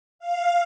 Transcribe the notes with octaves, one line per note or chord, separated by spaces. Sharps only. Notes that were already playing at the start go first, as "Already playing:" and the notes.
F5